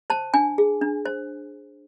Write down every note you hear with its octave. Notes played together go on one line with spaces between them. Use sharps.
C5 A5
D4 G#5
G#4
D4
C5